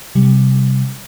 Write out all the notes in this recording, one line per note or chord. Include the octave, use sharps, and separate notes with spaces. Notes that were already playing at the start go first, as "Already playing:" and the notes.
C3 G3